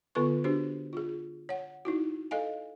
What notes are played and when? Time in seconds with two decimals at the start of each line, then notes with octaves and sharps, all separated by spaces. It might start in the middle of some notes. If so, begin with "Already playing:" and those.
0.15 D3 B3 F4 A4 B4 C#6
0.44 D4 F#4 G4 C5
0.93 F4 G#4
1.49 C#5 F#5
1.85 D#4 E4 F#4
2.31 A4 D#5 F5 G#5